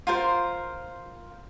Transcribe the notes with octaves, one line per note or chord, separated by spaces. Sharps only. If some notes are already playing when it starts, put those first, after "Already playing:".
F4 A#4 C5